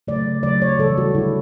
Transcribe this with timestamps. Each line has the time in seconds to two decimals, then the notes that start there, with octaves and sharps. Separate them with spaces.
0.08 C#3 F#3 A3 D5
0.43 C#3 F#3 A3 D5
0.62 C#5
0.79 C#3 E3 G3 A4
0.98 F#4
1.15 D3 G3 E4